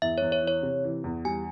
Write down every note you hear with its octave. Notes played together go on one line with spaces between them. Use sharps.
E2 E5
C#5
E2
C#5
E3
C#5
C3
E3
E2
G3 G#5